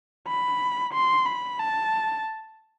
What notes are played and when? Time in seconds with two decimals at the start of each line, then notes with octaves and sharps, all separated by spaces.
0.27 B5
0.93 C6
1.26 B5
1.59 A5